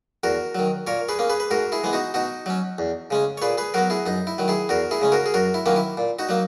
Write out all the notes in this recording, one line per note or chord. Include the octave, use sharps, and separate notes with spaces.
E2 F#4 A#4
D#3 F#3
A#2 A#4 C#5
G#4 B4
A#3 C#4
G#4 B4
B4
G#2 F#4 A#4
E4 G#4
E3 G#3 B3
D#4 F#4
B2 D#4 F#4
F#3 C#4
E2
C#3 G#3 C#4
C#5
A#2 G#4 B4
G#4 B4
F#3 B3 F#4 A#4
E4 G#4
F#2 D#4
E4
D#3 F#3
E4 G#4
E2 F#4 A#4
E4 G#4
C#3 G#3 C#4
F#4 A#4
G#4
F#2 F#4 A#4
E4
D#3 F#3 A#3 C#4
E4
A#2
D#4 F#4
F#3 A#3